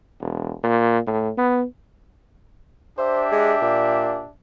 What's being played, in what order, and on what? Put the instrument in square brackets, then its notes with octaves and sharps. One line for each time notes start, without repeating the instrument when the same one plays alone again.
[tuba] E1
A#2
A2
B3
[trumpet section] D4 G4 E5 [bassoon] C5
[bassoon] G#3
A#2